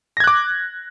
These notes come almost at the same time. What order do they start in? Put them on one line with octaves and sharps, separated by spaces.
A#6 G#6 F#6 D6